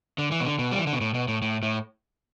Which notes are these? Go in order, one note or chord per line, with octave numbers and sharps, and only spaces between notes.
D3
E3
B2
D3
B2
G3
E3
D3
B2
A2
B2
A2
A2
A2